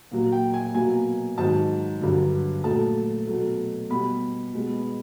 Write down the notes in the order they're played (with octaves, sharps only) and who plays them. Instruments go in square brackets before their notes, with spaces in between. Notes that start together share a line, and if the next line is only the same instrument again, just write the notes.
[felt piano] A#2 F#3 A#3
G5
G#5
B2 F#3 A#3 G#5
G#2 D#3 F#3 A5
G2 D3 F#3
A#2 F#3 A3 A5
B2 F#3 A3
B2 G3 B3 B5
B2 G#3 B3